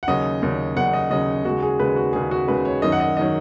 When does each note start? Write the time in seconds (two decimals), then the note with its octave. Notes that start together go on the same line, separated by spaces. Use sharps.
0.03 F#5
0.08 D#2 C#3 F#3 D#5
0.42 D#2 C#3 F#3
0.76 D#2 C#3 F#3 F#5
0.93 D#5
1.10 D#2 C#3 F#3 D#5
1.44 D#2 C#3 G#3 F#4
1.63 G#4
1.79 D#2 C#3 G#3 B4
1.96 F#4
2.13 D#2 C#3 G#3 G#4
2.31 F#4
2.48 D#2 C#3 G#3 B4
2.65 C#5
2.82 F#2 D#3 F#3 D#5
2.92 F#5
3.00 D#5
3.17 D#3 F#3 D#5